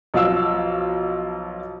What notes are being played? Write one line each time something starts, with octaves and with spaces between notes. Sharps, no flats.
B1 F3 F5 E6